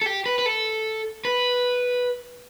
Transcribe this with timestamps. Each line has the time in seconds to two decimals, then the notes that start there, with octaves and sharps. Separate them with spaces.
0.02 A4
0.06 G4
0.26 B4
0.39 B4
0.46 A4
1.25 B4